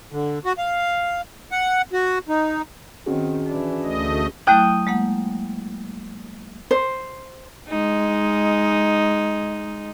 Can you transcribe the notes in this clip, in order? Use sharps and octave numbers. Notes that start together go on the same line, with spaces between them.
D3
F#4
F5
F#5
F#4
D#4
D#3 C4 C#4 F#4 G#4
E3 D4
D2 A3 D#5
F#3 A3 E4 G5 D#6 F#6
G#3 A#3 F#5
C5
G#3 D#4